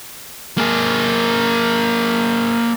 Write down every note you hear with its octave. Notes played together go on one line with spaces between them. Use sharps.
A#3 G#4